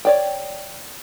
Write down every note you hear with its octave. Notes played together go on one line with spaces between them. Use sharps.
C#5 D5 G5